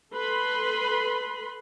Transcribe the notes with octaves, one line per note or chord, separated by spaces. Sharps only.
A4 B4 B5 C6